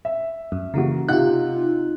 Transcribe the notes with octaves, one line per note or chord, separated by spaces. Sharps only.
E5
F#2
C#3 E3 A#3 F#4
C3 D#4 F4 F#5 F#6